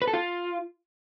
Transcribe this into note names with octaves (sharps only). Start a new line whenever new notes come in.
B4
A4
F4